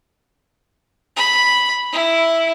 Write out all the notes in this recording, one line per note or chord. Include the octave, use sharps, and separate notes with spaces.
B5
E4